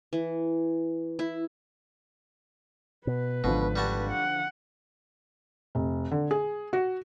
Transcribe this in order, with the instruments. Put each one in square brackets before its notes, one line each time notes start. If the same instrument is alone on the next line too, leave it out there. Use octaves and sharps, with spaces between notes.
[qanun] E3
E4
[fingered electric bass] B2 [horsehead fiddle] B4
[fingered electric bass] G#1 [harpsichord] B2 [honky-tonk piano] D3 F3
[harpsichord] G3 F#4 A5
[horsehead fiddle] F#5
[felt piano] F1
D3
G#4
F#4